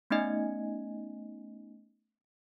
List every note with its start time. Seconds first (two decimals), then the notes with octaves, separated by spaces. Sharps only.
0.10 A3 B3 C#4 D#4 D#5 G#5